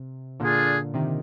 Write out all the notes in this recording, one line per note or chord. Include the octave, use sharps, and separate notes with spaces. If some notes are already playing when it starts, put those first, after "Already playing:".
Already playing: C3
A#2 D3 D4 F4 G#4
C3 D#3